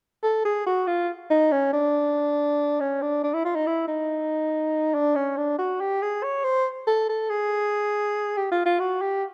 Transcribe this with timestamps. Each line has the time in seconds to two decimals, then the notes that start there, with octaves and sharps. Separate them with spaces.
0.23 A4
0.45 G#4
0.66 F#4
0.87 F4
1.30 D#4
1.52 C#4
1.73 D4
2.80 C#4
3.02 D4
3.23 D4
3.34 E4
3.45 F4
3.55 D#4
3.67 E4
3.88 D#4
4.94 D4
5.16 C#4
5.37 D4
5.59 F#4
5.80 G4
6.02 G#4
6.23 C#5
6.44 C5
6.87 A4
7.09 A4
7.30 G#4
8.37 G4
8.51 F4
8.66 F4
8.80 F#4
9.01 G4